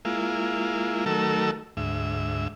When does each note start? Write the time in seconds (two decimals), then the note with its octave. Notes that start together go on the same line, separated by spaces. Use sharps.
0.05 G#3 A#3 E4 F4
1.06 D#3 F#3 A3 A4 A#4 E6
1.77 D2 G#2 E5